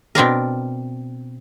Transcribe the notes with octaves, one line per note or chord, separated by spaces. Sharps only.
B2 C4 D4 A#4